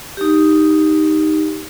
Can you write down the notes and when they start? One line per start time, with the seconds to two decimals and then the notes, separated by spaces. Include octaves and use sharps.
0.17 D#4 G4